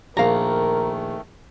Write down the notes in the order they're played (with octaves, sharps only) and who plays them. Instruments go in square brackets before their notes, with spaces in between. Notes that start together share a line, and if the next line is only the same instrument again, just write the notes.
[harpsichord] A#1 [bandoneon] D#3 A3 [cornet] A#4 [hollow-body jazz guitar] F5 A#5